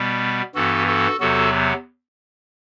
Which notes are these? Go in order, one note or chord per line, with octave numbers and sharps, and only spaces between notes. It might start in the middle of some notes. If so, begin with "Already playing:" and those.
Already playing: B2 G3 B3
G2 E3 B3 F#4 A4
F#4 A4
E2 C3 F#3 B3 F#4 A4